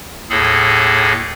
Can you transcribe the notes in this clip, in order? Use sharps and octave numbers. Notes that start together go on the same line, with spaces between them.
D#2 A2 G#4 A4